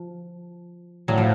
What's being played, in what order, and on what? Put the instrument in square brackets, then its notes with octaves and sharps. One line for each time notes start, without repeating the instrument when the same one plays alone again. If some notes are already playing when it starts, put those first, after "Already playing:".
Already playing: [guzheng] F3
[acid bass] A2 [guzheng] F#3
[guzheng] F3